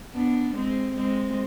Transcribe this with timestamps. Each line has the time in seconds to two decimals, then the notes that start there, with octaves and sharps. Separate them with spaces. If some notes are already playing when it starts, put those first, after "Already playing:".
0.14 B3 D4
0.56 G#3 C4
0.97 G#3 C4